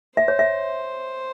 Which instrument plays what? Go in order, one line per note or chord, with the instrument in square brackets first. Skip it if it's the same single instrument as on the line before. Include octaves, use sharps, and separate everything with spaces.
[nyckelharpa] C5 [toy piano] E5
[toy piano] C#5
E5